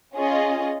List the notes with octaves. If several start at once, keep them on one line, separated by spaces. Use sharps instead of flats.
C#4 F4 G#4 D#5